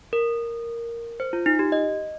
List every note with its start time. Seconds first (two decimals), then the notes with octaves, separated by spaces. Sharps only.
0.13 A#4
1.20 C5
1.33 F4
1.46 D#4
1.59 G4
1.72 D#5